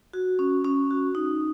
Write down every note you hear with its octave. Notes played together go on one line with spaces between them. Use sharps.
F#4
C#4
C#4
F#4
D#4